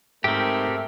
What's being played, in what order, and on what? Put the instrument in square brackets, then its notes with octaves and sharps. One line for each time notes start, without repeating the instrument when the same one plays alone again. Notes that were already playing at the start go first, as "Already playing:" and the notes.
[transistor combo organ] G#2 [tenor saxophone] A3 [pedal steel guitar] C4 G4 [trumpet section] A#4